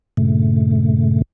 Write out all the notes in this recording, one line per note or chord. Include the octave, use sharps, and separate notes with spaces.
G2 A#2 C#3 A3